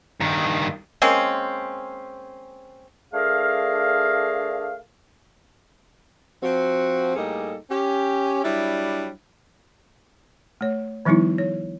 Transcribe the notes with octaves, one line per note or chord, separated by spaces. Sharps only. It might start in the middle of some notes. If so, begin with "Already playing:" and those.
G2 D#3
G#3 A#3 C4 C#4
A3 D4 G#4 A#4 F5
F3 C4 F#4
A2 G3 A#3 D#4 G#4 A4
C#4 G4
F#3 G3 D4 E4
A3 C#5
D#3 F3 G3 B3 D#4 E4
C#5